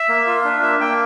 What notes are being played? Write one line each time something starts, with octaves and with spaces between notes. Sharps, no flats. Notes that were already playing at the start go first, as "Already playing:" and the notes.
Already playing: E5
A#3
F4
D4
A#3 E5
A#3 G5